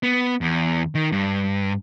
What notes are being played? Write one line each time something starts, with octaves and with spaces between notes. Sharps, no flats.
B3
E2
D#3
G2